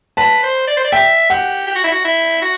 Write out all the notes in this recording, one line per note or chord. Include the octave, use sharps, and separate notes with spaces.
B4 A5
C5
D5
C5
D5
E5 G5
G4 F#5
G4
F#4
E4
F#4
E4
F#4